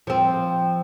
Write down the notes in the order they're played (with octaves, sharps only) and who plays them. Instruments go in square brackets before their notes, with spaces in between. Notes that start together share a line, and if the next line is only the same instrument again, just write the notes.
[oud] F3 C4